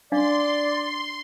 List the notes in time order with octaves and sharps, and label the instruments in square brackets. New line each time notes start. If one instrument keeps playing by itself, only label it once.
[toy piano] D4 F5 [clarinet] D5 [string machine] C6